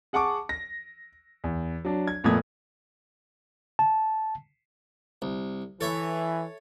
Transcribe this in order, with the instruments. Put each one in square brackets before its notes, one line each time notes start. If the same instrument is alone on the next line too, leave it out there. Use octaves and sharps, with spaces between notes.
[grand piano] G#4 F#5 A5 C#6 D6
A#6
E2
F#3 D4
G#6
F2 A#2 A3 B3 D#6 G#6
[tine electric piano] A5
[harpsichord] C2
[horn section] E3 [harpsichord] A4 C#5 E5